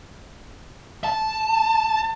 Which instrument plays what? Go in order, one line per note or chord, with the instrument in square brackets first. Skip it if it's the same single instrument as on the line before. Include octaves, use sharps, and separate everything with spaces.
[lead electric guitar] A5